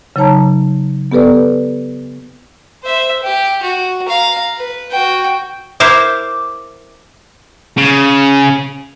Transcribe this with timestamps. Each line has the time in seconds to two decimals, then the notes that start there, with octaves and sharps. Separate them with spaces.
0.16 C#3 F#3 D#4 C#5 A5 A#5
1.12 B3 G4 A4 B4 D5
2.84 C5 E5
3.23 G4
3.62 F#4
4.07 F5 A#5
4.57 B4
4.91 F#4 G5
5.80 E4 A#4 C5 D6
7.77 C#3